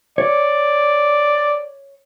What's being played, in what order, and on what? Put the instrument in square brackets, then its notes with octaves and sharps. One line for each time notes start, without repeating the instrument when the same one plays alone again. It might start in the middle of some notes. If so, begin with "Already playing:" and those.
[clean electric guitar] C#5 [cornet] D5